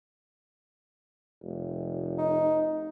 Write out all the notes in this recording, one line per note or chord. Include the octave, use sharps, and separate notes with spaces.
F1
D#4